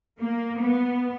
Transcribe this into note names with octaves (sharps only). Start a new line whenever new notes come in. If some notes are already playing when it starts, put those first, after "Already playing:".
A#3
B3